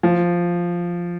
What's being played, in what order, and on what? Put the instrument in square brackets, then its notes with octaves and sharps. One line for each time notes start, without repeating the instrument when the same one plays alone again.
[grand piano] F3